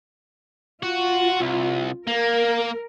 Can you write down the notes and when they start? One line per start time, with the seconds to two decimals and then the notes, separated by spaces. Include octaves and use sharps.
0.83 F4 F#4
1.41 C2
2.07 A#3 A#4